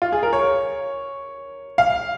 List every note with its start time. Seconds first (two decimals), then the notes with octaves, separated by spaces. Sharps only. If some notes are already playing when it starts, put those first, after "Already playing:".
0.02 F4
0.12 G#4
0.23 A#4
0.33 C#5
1.78 F5